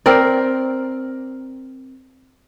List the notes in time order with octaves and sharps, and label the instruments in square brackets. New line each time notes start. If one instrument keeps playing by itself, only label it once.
[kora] C4 A#4 D5